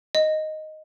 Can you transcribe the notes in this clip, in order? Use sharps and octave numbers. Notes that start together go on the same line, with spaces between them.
D#5